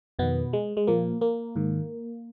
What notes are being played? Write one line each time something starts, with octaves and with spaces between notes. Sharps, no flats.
F2 B2 D#3 B3
G#3
G#3
A#2 F3 A#3
A#3
G#2 D#3